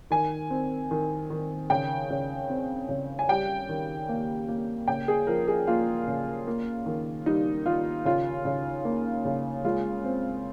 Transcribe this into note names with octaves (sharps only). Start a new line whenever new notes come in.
D#3 G#5
C4
D#3
D#3
C#3 G5
C#3
C4
C#3
G#5
G3 G5
D#3
A#3
A#3
C#3 G5
G#4
F3 A#4
G#4
A#3 F4
C#3
A#3
D#3
G3 D#4
D#3 F4
C#3 F4
C#3
A#3
C#3
G#3 F4
C4